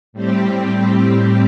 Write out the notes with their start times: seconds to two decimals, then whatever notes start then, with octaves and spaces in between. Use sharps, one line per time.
0.13 A2 G3 C4 G4